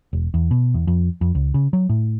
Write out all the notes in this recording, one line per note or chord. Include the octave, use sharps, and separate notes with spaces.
E1
E2
B2
E2
F2
F2
C#2
C#3
F#3
A2